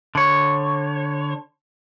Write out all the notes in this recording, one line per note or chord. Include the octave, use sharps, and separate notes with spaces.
D3 C#5